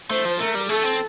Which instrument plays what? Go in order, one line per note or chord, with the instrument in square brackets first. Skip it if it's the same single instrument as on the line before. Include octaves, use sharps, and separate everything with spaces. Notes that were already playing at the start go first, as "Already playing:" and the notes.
[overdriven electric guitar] A3 [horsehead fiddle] C5
[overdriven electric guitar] F3
[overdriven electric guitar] A3 [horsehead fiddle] A#4
[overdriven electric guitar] G3
[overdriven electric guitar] A3 [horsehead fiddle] A4
[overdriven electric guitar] C4